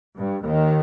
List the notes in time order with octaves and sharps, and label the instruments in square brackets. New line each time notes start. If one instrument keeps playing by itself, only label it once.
[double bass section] G2
D#2 D#3